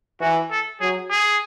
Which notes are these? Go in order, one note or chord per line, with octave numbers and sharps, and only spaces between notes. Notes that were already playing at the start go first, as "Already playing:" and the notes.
E3 F#4
A4
F#3 G#4
G#4